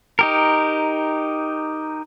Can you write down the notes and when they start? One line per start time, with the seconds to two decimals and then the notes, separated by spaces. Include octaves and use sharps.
0.19 D#4 G4 A#4